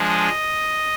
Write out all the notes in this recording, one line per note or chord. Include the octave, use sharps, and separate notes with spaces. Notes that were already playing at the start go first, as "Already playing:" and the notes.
Already playing: F3 G#3 D4
D#5